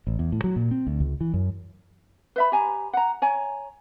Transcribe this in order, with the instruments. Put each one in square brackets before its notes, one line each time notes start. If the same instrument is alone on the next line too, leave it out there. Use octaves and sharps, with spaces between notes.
[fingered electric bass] A1
E2
A2
F#3
A#2
C4
D2
C#2
E3
F#2
[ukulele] B4 E5 B5
G4 G#5 A#5
F#5 A#5
C#5 G#5 A#5